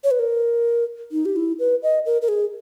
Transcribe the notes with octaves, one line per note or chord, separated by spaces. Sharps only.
C#5
B4
A#4
D#4
G4
E4
B4
D#5
A#4
A#4
G#4